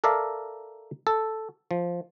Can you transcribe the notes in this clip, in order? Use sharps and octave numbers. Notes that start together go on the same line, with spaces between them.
A4 A#4 D5 E5 F5 A5
A4
F3